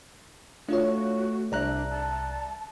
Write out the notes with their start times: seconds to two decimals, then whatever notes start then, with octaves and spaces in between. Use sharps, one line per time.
0.69 A3 D4 F4 F#4 C#5
1.52 C2 D4 D5 E5 A#5 F#6
1.91 A5